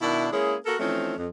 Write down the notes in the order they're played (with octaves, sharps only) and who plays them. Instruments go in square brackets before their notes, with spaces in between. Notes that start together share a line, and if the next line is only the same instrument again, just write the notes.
[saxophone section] B2 D#3 D4 E4
G#3 A#3 C#4 E4 G#4
A#3 F#4 A4 A#4
E3 F3 A3 C4 C#4 D#4
F2